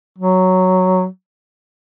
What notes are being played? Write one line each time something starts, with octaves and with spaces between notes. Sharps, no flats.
F#3